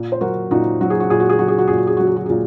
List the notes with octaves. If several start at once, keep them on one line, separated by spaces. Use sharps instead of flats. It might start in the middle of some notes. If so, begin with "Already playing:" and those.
Already playing: A#2
C5
F#3 F#4 A#4
A#2 D#4 F#4
F#3 F#4
G#4
F#4
A#2 G#4
F#4
G#4
F#3 F#4
G#4
F#4
A#2 G#4
F#4
G#4
F#3 F#4
G#4
F#4
A#2 G#4